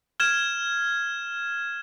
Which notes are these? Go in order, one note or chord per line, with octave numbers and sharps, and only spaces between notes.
F6 G#6 E7